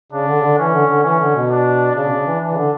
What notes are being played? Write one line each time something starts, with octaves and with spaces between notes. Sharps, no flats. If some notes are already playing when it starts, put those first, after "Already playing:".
C#3 D4
D3
C#3
D3
E3 C#4
D3
D3
E3 C#4
D3
B2
D4
C#3 D4
B2
C#3
E3
E3 D4
C#3
D3